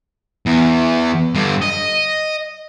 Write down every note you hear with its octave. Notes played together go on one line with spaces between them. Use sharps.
E2
G2 D3
D#5